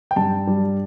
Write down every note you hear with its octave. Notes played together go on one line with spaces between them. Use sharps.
G5
G2 A5
G3